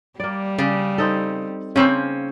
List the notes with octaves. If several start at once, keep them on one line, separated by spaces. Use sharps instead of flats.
G3 A#3 D5
C#3 D5
C4 D#4 A4
C#3 A#3 C4 C#4 C5